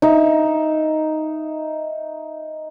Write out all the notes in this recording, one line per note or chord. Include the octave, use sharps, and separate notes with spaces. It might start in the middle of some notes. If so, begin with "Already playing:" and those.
D#4 E5